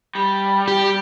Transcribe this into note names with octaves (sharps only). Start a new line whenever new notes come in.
G3
G4